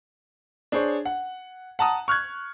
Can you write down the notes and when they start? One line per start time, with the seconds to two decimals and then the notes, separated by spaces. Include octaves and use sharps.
0.72 D4 G#4 C5 C#5
1.05 F#5
1.79 F#5 A5 A#5 D#6
2.08 C#6 F6 F#6 G#6